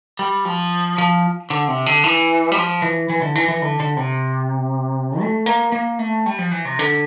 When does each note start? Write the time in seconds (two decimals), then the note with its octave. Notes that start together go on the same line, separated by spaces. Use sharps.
0.19 G3
0.45 F3
0.98 F3
1.50 D3
1.68 C3
1.86 D3
2.04 E3
2.52 G3
2.56 F3
2.82 E3
3.09 E3
3.22 D3
3.35 E3
3.48 E3
3.62 D3
3.80 D3
3.97 C3
5.20 A3
5.46 A#3
5.72 A#3
5.99 A3
6.26 G3
6.38 F3
6.51 E3
6.65 C3
6.79 D3